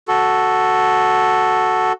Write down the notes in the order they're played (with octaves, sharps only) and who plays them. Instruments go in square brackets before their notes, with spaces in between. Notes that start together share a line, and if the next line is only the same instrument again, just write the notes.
[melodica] F#4 A4